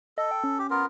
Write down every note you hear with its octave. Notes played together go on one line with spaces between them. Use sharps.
A4 D#5
G5
C#4
G4
B3 F4 A#4